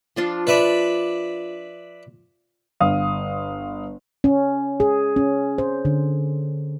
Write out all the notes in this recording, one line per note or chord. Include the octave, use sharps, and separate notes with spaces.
F3 D4 F4
B4 D5 E5 D6
G1 F5 D#6
C#4
G#4
C#4
C5
D3